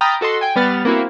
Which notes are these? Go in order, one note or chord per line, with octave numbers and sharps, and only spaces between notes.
G5 A#5 B5 D#6 F6 A6
F#4 A4 D#5 C6
G5 G#5
G3 B3 F6 A6
A#3 C4 E4 F#4